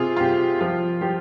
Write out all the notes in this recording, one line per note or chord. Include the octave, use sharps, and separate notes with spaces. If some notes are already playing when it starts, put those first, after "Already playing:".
Already playing: C3 F4 G#4
F4
C3 G4
F3 F4
F3 G4